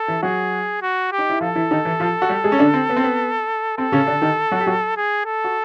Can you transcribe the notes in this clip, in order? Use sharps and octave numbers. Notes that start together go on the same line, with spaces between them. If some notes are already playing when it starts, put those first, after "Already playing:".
Already playing: A4
E3 E4
F#3 F#4 G#4
F#4
G4
D#4
E4
F3 F4 A4
E3 E4
D#3 D#4
E3 E4
F3 F4
F#4
G3 G4
G#3 G#4
C#4
D3 D4
C4
B3
C4
B3
C4 A4
C#3 C#4
D3 D4
D#3 D#4
F#3 F#4
G4
F#3 F#4
G#4
A4
F#4